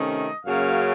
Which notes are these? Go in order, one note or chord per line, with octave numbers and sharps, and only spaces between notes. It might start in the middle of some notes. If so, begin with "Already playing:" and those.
Already playing: C3 D#3 A3 C#4 D#5
F#2 C#3 F#3 A#3 C#4 F5